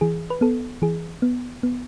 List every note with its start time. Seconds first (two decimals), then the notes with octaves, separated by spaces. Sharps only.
0.01 E3 G#4
0.30 B4
0.41 B3 A4
0.82 E3 G#4
1.22 B3
1.63 B3